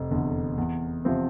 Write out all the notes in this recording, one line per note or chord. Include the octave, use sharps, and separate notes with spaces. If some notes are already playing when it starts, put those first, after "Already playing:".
Already playing: F1
E2 D3
E2
C3 F3 C4